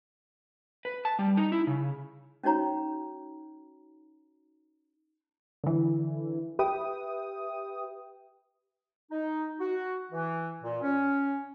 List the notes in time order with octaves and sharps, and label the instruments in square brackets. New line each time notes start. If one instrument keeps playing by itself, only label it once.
[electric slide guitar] B4
A5
G3
D#4
E4
C#3
[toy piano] C#4 D#4 F#4 C#5 A#5
[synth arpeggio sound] D3 E3
G4 B4 E5 G5 D#6
[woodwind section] D#4
F#4
E3
A#2
C#4